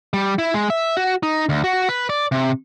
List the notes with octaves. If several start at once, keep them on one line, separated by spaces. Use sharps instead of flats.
G3
E4
G#3
E5
F#4
D#4
D2
F#4
B4
D5
C3